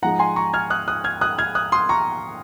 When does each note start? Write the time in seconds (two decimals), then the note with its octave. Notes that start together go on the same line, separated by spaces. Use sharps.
0.02 G#2 F3 G#3 F#5 A#5
0.19 G#5 C6
0.36 A#5 C#6
0.54 F6 G#6
0.70 D#6 F#6
0.88 D#6 F#6
1.04 F6 G#6
1.21 D#6 F#6
1.38 F6 G#6
1.55 D#6 F#6
1.72 C6 D#6
1.89 A#5 C#6